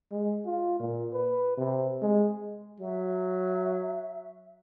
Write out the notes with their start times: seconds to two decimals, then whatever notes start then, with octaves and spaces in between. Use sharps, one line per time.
0.11 G#3
0.46 F4
0.80 A#2
1.13 B4
1.57 C3
2.02 G#3
2.80 F#3 E5